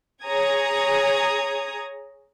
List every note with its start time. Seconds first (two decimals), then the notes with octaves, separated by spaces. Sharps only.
0.23 G#4 C#5 A#5 D#6 G#6